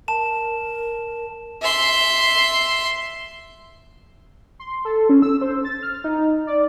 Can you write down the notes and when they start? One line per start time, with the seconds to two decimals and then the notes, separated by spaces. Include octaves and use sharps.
0.08 A#4 A5 E7
1.62 E5 C6
4.60 C6
4.85 A4
5.09 C#4
5.22 E6
5.41 C5
5.65 A6
5.83 F6
6.04 D#4
6.47 D5